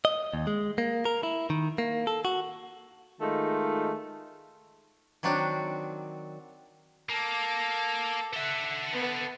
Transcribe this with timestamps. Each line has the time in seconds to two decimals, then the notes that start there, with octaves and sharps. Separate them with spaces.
0.05 D#5
0.34 D#2
0.47 G#3
0.78 A#3
1.05 A#4
1.23 E4
1.50 D#3
1.78 A#3
2.07 A4
2.25 F#4
3.20 D#3 G#3 A3 D#4 F4
5.23 D#3 F#3 C4 D4 F#4
7.09 A#3 A4 D6
8.33 A4 E5 F#5
8.92 B3